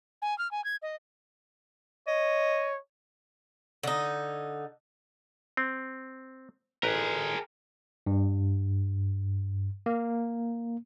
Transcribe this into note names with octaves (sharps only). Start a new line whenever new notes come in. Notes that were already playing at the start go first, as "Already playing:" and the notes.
G#5
F6
G#5
G#6
D#5
C#5 D#5
D3 D#4
C4
A1 G#4 A#4 B4 G5
G2
A#3